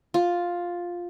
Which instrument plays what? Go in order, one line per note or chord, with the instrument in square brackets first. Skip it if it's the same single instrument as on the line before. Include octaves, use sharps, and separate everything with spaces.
[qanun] F4